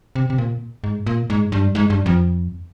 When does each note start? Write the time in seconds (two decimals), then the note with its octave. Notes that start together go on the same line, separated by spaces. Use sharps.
0.15 C3
0.30 C3
0.38 A#2
0.84 G#2
1.06 A#2
1.30 G#2
1.52 G2
1.75 G#2
1.90 G2
2.06 F2